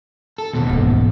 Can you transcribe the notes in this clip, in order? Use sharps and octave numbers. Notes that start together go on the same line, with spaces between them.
A4
D#2 B2
G#2 E3